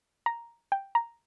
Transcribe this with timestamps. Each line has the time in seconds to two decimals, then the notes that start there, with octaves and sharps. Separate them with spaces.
0.26 A#5
0.72 G5
0.95 A#5